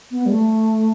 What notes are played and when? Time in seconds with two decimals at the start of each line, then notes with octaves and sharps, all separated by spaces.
0.11 B3
0.26 G3
0.31 A3